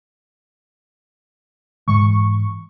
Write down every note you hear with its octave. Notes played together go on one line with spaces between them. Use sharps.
G#2 E3 G#3 C#6